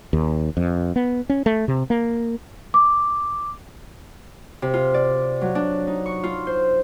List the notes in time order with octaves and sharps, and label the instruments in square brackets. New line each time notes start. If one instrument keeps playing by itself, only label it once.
[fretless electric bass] D#2
F2
B3
C#4
A3
C3
A#3
[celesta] D6
[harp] C3
F4
D5
F#3
D4
D#4
C#6
F4
C5